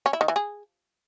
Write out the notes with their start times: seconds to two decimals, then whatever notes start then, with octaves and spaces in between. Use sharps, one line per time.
0.06 C#4
0.13 E4
0.21 D#3
0.28 E3
0.36 G#4